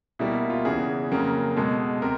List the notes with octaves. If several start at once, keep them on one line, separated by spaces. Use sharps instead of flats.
B2 G3 A#3 E4
F4
E2 C#3 E3 G#4
F2 C#3 F#3 A#3
B2 G#3 A4
C3 A#4